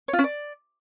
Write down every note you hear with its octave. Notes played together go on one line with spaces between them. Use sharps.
C#5
F4
C#4
D5